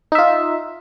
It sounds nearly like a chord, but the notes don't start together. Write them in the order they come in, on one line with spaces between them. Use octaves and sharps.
D#4 E5 F4